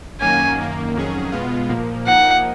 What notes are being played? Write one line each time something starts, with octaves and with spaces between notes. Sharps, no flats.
F#2 D#3 F#3 A#3 C#4 G#5
F#2 D#3 A#3
F2 D#3 F#3 C#4 G#4
B2 G#3 B3 F4
A#2 F3 A#3
F3 A#3 D#4 F#5